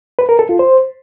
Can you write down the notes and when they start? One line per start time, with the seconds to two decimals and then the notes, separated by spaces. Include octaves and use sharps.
0.19 B4
0.29 A#4
0.39 A4
0.49 F4
0.59 C5